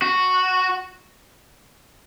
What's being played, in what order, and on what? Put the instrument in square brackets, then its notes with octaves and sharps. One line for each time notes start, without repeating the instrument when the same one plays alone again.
[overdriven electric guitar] F#4